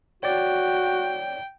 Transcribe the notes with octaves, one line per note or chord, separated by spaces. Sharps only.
F#4 C#5 D5 G5